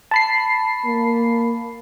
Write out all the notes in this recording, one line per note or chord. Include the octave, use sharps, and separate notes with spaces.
A5 B5 C7
A#3